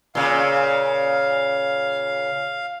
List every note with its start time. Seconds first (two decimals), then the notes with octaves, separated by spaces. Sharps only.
0.15 A#2 C#3 F5